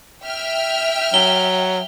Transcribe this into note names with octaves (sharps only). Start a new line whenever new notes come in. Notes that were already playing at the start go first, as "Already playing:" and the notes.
E5 G5 F6
F#3 G7